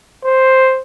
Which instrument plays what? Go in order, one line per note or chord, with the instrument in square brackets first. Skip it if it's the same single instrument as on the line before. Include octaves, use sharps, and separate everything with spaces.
[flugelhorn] C5